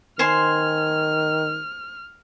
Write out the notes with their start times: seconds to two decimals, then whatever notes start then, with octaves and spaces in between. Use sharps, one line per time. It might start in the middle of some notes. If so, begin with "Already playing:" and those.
0.19 D#3 C5 G#5 C6 F6